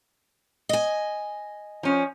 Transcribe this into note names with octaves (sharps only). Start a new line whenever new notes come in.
D#5 G#5
F3 C#4